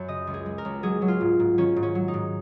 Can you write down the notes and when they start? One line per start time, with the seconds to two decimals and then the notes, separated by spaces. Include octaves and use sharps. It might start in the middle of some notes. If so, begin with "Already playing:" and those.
Already playing: F#2 F#3 C#5
0.08 C#3 D#5
0.27 C#2
0.34 G#4
0.46 G#3
0.58 A#4
0.65 C#2
0.83 F#3 G#4
1.02 F#3
1.08 F4
1.21 G#2
1.40 G#2
1.58 D#3 C#4
1.76 G#2
1.83 C#4
1.95 F#3
2.08 D#4
2.14 G#2